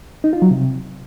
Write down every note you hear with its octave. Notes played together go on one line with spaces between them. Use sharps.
D#4
F4
F#3
C3